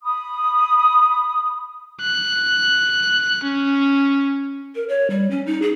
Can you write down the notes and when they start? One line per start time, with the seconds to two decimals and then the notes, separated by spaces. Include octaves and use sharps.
0.03 B5 D#6
2.01 F#6
3.43 C#4
4.75 A#4
4.89 C#5
5.10 G3
5.31 C#4
5.46 D#4
5.62 G#4